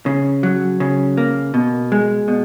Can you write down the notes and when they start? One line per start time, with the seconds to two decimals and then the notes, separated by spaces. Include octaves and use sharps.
0.06 C#3
0.43 F#3
0.80 C#3
1.17 A#3
1.54 B2
1.92 G#3
2.28 B2